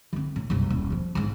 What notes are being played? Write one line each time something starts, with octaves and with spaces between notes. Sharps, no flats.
D3 C4
A2
F#1 C2
D#1
F2 F3
E2 G#2